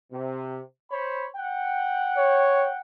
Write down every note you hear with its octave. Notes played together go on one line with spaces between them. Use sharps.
C3
C5 C#5 B5
F#5 G5
C#5